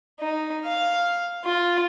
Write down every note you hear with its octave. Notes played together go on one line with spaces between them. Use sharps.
D#4
F5
F4